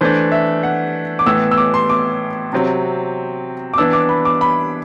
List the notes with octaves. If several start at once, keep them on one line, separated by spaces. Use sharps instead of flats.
E3 A3 D4 C5
E5
F#5
D6
A2 E3 B3 E6
E6
D6
C6
D6
C3 F#3 C4
D6
E3 B3 D4 E6
D6
B5
D6
B5